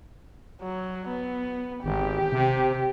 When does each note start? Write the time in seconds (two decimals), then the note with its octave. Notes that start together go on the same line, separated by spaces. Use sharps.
0.61 F#3
1.08 B3
1.84 G#1 G4
2.32 C3